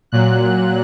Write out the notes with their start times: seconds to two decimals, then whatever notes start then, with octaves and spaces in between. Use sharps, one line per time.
0.12 A#2 F#3 F#6